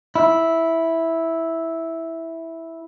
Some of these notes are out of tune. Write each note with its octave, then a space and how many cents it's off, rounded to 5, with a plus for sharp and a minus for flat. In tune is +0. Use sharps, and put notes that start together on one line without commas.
E4 -5